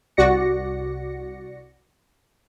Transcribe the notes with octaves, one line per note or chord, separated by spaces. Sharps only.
C2 F#4 D5 A#6 C#7